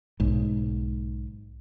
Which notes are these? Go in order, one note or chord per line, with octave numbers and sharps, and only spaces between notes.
B1 G#2